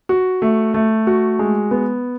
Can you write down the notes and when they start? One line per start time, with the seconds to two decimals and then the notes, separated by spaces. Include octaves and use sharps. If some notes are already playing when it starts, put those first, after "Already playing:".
0.09 F#4
0.42 A3
0.74 A3
1.07 F#4
1.39 G#3
1.71 B3